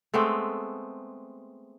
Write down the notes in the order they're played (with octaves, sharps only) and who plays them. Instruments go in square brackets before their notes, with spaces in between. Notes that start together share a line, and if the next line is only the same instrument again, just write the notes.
[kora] G#3 A3 B3 C4